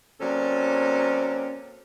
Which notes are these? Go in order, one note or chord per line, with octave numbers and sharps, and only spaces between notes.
F#3 A#3 C4 C#4 A4 D5